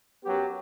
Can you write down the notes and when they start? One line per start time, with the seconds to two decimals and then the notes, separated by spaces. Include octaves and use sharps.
0.24 F#2 F#3 B3 G4